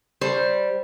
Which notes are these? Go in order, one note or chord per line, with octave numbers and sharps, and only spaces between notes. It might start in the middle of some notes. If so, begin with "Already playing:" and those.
G3 C5